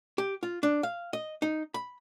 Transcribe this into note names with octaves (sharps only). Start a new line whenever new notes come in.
G4
F4
D4
F5
D#5
D#4
B5